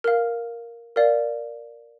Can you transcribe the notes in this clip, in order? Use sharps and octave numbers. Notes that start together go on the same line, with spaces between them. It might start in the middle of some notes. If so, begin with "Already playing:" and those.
A#4 F5 F6
A#4 D5 F5